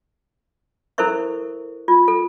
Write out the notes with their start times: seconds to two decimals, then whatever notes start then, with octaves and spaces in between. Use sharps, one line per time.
0.98 E4 A4 A#4 C5 E5 C#6
1.88 F4
2.08 A4